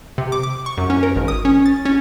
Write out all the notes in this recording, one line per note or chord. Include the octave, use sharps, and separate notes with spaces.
C3
D6
D6
C#6
F#2
C#4
A#4
G#1
D#6
C#4
A6
C#4